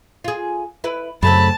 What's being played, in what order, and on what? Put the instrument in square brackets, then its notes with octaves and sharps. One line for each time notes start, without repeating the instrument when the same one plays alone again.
[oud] F4 G#4
E4 B4
[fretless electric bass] F#2 [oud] C#3 A3 C4 [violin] A5 [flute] B5